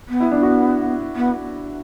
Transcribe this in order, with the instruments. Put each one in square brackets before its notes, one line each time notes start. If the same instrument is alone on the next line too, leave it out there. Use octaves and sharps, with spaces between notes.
[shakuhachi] B3
[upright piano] E4
D4
F#4
[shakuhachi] B3